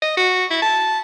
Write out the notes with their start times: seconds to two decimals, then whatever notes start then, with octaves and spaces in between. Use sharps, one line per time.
0.02 D#5
0.17 F#4
0.51 E4
0.62 A5